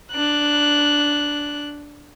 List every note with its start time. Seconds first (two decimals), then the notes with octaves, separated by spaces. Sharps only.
0.12 D4 F#6